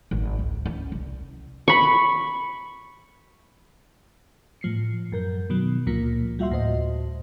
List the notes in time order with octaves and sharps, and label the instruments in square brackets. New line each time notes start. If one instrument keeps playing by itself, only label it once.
[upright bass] G#1
C#2
C#4
C2
[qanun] B5 C#6
[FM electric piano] A2 F3 C7 C#7
F#2 A#4 G6
B2 D#3 F#3
C#2 A#2 F3 A#3
G3 F4 F#4 E5 F#5 C6
D2 A2 F#4 C5 D#5